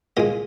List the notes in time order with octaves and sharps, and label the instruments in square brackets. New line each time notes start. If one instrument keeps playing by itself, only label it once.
[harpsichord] C2 A#2 G#3 D#5